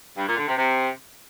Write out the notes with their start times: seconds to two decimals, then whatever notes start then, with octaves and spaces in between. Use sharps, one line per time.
0.17 G2
0.28 A#2
0.38 D3
0.48 C3
0.58 C3